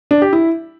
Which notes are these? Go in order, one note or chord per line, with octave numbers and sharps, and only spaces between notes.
D4
G4
E4